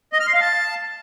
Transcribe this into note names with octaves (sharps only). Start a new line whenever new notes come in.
D#5
F6
C6
F5
A5